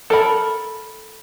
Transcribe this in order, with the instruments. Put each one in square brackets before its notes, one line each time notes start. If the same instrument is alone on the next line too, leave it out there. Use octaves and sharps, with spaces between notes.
[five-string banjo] A4 A#4 B5